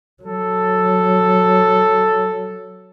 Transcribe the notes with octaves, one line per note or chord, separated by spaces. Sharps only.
F#3 A4